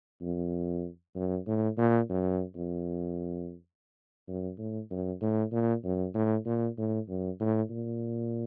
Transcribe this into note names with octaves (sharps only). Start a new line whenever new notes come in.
F2
F#2
A2
A#2
F#2
F2
F#2
A2
F#2
A2
A#2
F#2
A2
A#2
A2
F#2
A2
A#2